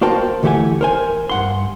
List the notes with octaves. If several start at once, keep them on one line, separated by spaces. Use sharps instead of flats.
A#3 F#4 A#4 C5 G5 A5
D2 E3 A3 G4 F#5 G#5
A#4 C5 G#5
G2 F#5 C6